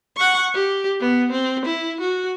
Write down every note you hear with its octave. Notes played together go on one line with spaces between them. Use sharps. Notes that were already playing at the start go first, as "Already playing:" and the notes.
F#5 C#6
G4
B3
C4
E4
F#4